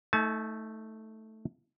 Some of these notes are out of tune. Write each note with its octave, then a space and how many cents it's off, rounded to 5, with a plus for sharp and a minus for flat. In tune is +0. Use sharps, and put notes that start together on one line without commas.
A3 +0 D#4 +30 A5 -45